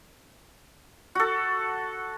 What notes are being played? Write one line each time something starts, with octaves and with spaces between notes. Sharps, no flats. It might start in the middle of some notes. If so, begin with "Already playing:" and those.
F#4 A4